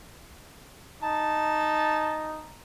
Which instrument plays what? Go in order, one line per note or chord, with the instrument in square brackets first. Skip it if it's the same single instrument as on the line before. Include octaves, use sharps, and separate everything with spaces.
[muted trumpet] D#4 [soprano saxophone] A5